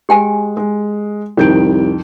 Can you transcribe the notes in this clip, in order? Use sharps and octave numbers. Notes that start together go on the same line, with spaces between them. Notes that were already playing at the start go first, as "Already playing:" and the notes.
G#3 G4 G5 G#5
G#3
C2 F2 D#3 G6 D7